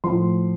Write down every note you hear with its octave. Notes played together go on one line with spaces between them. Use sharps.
A2 F3 C6